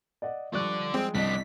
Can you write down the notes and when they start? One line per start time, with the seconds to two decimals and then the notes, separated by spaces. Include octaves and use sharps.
0.22 D5 D#5 F#5
0.53 F3 G3 A4 D5 C#6 F#6
0.94 G#3 C4 G5
1.15 C2 B3 D4 D#5 B6